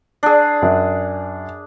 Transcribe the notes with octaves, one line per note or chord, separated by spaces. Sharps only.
D4 G#4
F#2